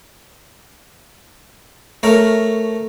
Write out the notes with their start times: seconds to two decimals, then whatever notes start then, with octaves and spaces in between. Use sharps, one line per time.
2.03 A3 A#4 C#5